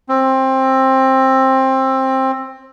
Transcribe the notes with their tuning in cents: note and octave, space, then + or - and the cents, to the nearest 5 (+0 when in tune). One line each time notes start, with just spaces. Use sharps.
C4 +20